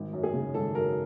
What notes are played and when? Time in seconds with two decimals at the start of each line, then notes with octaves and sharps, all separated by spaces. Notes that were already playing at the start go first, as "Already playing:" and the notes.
Already playing: G#1
0.13 F#2
0.23 G#4
0.34 C#3
0.54 G#1 A4
0.75 F#2 A#4